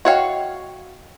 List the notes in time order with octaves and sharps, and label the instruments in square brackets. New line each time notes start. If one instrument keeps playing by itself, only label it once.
[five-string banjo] F#4 C#5 F5 [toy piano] D#5 G5